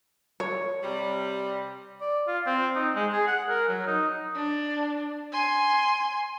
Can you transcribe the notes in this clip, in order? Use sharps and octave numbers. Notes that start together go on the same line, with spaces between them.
C#5
C3 G3
D5
F4
C4
D#4
G#3
G#4
F#5
A#4
F#3
D#4
D4
G#5 C6